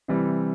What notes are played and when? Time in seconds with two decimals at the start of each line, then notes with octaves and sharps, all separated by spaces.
0.08 C3 E3 G3